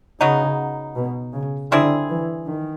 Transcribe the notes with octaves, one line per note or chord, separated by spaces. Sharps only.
C#3 F#3 B3 D#4
B2
C#3
D3 G3 C4 E4 G#4
E3
D#3